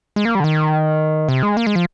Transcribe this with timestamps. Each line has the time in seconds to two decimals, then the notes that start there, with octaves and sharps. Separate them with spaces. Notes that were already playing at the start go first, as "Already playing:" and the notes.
0.16 G#3
0.25 A#3
0.35 G3
0.40 D3
0.44 D#3
1.28 C3
1.43 G#3
1.57 A#3
1.67 G#3
1.76 F3